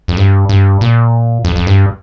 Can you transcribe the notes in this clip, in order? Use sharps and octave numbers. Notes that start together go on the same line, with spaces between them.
F2
G2
G2
A#2
F2
F2
G2